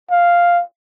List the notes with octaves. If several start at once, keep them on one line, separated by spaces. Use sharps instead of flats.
F5